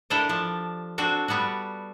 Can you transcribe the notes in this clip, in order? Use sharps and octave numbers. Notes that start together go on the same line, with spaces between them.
D4 E4 G4 A4 A#4 D#5
F3 D4 A5
C4 D4 F#4 A4
G3 B3 D4 F#4